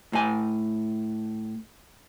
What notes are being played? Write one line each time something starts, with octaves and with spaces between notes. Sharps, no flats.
A2 G#5